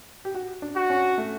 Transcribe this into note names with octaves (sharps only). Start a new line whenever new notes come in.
G4
F#4
D4
F#4
C#4
A3